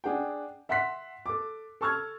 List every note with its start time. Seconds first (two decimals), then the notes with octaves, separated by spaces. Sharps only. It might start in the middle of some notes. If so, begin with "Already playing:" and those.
0.04 D4 G#4 F#5 G5
0.69 E5 F#5 C6 F#6 B6
1.26 A4 D6
1.81 A4 A5 C#6 E6 F6 G#6